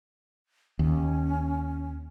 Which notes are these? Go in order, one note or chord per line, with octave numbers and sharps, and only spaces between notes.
D#2 C#4